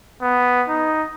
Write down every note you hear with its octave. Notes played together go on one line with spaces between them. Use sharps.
B3
D#4